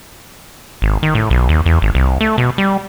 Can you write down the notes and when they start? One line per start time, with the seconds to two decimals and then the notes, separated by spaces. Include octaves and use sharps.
0.82 G#1
1.03 D#3
1.15 A2
1.30 B1
1.49 D#2
1.66 E2
1.82 G#1
1.95 C2
2.21 A3
2.38 B2
2.58 G3